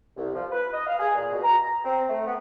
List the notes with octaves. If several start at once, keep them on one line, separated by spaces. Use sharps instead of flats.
C2
F3
B4
D#5
F5
G#4
A#2
B2
A#5
C4
A3
B3